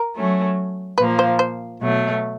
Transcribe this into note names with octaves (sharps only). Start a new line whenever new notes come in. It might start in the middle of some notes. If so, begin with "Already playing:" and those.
Already playing: A#4
F#3 A3 C#4
A#2 F3 A#3 B4
C5
C5
B2 F#3 A3